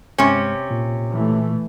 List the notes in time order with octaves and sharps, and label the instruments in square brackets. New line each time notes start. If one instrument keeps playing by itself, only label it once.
[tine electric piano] G2 G#3 F6 [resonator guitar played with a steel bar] C3 C#4
[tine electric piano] A#2
[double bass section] E3 A3